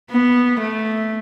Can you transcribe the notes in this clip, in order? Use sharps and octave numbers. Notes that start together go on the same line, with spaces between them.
B3
A3